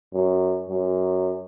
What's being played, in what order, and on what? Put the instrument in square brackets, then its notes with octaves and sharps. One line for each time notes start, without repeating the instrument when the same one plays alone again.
[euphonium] F#2
F#2